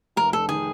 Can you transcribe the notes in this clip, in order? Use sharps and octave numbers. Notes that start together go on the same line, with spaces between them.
F1 A#4
F1 A4
D#3 G#4